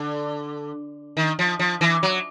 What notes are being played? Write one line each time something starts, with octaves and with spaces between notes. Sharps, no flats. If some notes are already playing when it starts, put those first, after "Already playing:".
Already playing: D3
D#3
F3
F3
E3
F#3